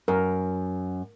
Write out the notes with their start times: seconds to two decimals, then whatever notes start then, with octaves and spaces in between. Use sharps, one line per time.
0.08 F#2 A#4